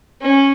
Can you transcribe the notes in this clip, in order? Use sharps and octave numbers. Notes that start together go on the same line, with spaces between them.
C#4